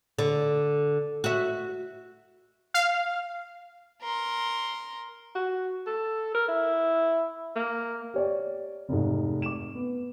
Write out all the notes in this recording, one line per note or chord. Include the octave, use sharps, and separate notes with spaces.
D3
F#4 E5
F5
A#4 C6
F#4
A4
A#4
E4
A#3
G4 C#5 D5
F1 G#2
D6 E7
B3